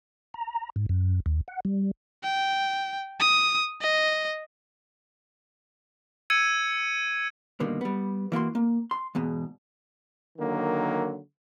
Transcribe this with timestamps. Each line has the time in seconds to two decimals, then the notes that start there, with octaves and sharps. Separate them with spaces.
0.34 A#5
0.76 G#2
0.89 F#2
1.26 D#2
1.48 F#5
1.65 G3
2.24 G5
3.20 D#6
3.81 D#5
6.30 E6 G#6 C#7 D#7
7.60 G2 B2 D3 D#3 A#3
7.81 G3 B3
8.32 E3 A#3 F#4 C6
8.55 A#3
8.91 C6
9.15 E2 G#2 B2
10.38 D3 D#3 F#3 A#3